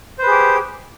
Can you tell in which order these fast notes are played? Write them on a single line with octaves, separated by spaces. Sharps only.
C5 B4 G#4 G4